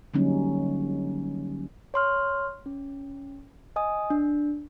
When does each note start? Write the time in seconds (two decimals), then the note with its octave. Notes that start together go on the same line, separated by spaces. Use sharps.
0.14 D3 F#3 G3 A#3 C#4 D#4
1.94 C#5 C6 F6
2.66 C#4
3.76 D#5 G#5 D#6
4.10 D4